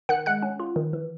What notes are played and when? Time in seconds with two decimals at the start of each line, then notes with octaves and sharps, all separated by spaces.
0.09 D#3 F#5 F#6
0.26 G#3 F#5 F#6
0.42 C#4
0.60 F4
0.76 D#3
0.93 E3